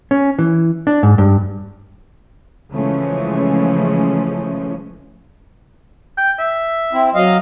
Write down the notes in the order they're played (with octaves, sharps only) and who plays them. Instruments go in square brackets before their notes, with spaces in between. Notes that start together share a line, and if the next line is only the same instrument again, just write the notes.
[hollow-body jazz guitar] C#4
E3
D4
G#2
G2
[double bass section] C#3 E3 F3 G#3 A3 C#4
[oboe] G5
E5
[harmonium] C4 E4
F#3 D#5 F5